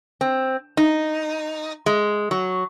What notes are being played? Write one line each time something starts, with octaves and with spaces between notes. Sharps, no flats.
C4
D#4
G#3
F#3